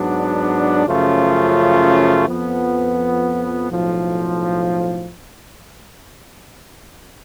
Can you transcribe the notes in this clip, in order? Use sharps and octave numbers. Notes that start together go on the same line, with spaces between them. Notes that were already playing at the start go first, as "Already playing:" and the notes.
Already playing: G#2 F#3 B3 D4
F#2 C#3 F3 A3 F4
F2 F3 B3
B1 A2 F3